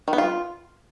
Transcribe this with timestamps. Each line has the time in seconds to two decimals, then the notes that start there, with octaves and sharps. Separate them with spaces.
0.08 D#3
0.13 B3
0.18 F4